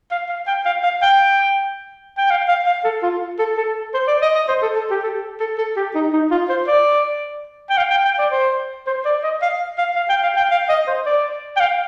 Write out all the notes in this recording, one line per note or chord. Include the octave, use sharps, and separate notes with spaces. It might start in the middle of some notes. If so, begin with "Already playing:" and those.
F5
F5
G5
F5
F5
G5
G5
F5
F5
F5
A4
F4
A4
A4
C5
D5
D#5
D#5
C5
A4
A4
G4
A4
A4
A4
G4
D#4
D#4
F4
C5
D5
G5
F5
G5
G5
D5
C5
C5
D5
D#5
F5
F5
F5
G5
F5
G5
F5
D#5
C5
D5
G5
F5